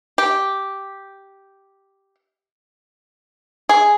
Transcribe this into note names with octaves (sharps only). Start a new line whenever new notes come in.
G4
G#4